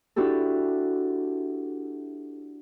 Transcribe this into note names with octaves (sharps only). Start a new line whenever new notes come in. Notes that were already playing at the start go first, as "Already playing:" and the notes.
D4 E4 F#4 G4 A4